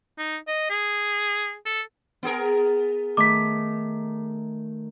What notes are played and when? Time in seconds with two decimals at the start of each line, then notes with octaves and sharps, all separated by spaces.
0.18 D#4
0.48 D#5
0.70 G#4
1.66 A4
2.23 B3 G#4 A#4
3.17 D#3 A3 D6 B6